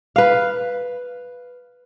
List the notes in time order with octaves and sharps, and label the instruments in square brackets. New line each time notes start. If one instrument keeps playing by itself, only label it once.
[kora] B4 F5